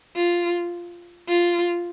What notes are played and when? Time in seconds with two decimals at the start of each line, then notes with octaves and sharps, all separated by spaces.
0.15 F4
1.28 F4